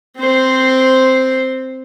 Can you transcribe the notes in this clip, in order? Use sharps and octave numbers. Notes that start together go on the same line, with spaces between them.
C4 C5